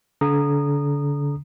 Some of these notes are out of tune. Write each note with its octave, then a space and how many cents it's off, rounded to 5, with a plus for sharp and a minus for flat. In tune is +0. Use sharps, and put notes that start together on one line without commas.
D3 -35 A#5 -5 D#6 -20